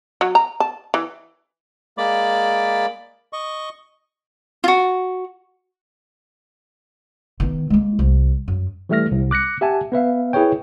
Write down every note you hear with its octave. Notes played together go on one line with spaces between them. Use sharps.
F#3
A#5
A5
E3
G#3 A#3 D5 B5 D6
D#5 C#6
F4 F#4
D#3 B3
G#3 A#3
C2
F#2
E3 G3 A3 E5 F6 A#6
C2
D6 F#6 A#6 C#7
G4 E5 F#5 G#5 A5
B3 B4 E5 F5
E4 G#4 B4 C#5 G5